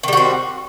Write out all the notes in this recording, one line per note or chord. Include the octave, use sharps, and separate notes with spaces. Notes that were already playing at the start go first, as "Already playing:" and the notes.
D#3 G3 C4 F#4